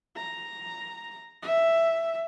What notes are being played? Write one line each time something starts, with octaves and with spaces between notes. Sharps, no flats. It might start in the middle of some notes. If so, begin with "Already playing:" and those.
A#5
E5